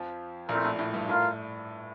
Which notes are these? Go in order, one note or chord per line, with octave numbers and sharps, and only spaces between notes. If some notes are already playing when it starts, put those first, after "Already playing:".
Already playing: F2 F3
A#1 A#2 A3 C4 E4 A#4
A2
A2
G2
A2 F4 A#4 F5